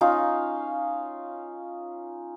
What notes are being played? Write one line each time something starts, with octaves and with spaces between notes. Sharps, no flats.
C#4 D#4 F4 F5